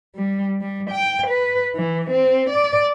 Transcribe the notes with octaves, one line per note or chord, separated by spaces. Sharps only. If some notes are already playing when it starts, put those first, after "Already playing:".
G3
G3
G5
B4
E3
C4
D5